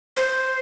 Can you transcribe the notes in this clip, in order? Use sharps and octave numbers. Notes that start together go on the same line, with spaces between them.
C5